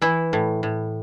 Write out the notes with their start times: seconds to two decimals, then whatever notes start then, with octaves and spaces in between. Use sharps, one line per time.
0.02 E3 E4
0.33 A2
0.63 A2